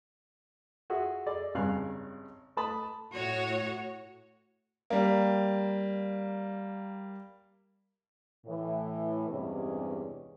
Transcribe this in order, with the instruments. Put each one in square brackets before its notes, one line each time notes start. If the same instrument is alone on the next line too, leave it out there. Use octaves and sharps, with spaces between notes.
[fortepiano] F4 F#4 G#4 E5
G#4 A4 D5 D#5
G#1 G2 C#3 F5 G#5 F#6
A3 B4 A5 B5 D#6
[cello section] A2 F#4 C#5
[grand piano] G3 A#3
[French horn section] A2 E3
E2 G2 C3 G#3 C#4 G4